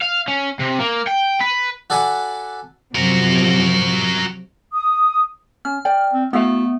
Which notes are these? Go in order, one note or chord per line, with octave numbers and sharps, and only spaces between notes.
F5
C#4
C3
A#3
G5
B4
F#4 A4 D5 F#5 G#5 B5
C3 F3 F#3 F#4 A#4
D#6
C#4 F6
D5 G5
C4
A3 B3 E4 F#4 F5